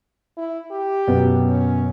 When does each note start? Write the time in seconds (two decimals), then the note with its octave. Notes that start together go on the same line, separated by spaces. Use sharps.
0.38 E4
0.71 G4
1.07 F#2 B2 B3
1.49 C#4